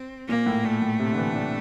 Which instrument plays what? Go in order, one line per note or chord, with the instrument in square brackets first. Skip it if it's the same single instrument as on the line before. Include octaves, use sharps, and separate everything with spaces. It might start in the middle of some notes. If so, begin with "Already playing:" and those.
Already playing: [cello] C4
[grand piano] A#2 [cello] A#3
[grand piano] A2
[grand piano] A#2 [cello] A3
[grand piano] A2
C3
D3
E3
D4